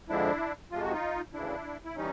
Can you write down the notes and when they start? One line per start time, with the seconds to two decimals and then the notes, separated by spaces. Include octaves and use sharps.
0.09 F2 D3 F3 G#3 D4 E4
0.71 F2 C3 F3 G#3 F4
0.82 F#4
0.92 D#4 F4
1.33 D2 C#3 E3 D4 E4
1.85 E4
1.96 E3 G3 C#4 D#4